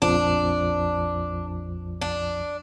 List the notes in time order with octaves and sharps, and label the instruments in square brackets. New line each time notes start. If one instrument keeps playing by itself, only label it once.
[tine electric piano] A#1 F2 F3 [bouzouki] D4
[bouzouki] D4